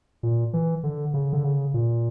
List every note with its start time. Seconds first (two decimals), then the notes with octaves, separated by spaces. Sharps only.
0.23 A#2
0.53 E3
0.83 D3
1.14 C#3
1.33 D3
1.44 C#3
1.74 A#2